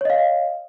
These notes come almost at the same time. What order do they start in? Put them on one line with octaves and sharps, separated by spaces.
C#5 D#5 F5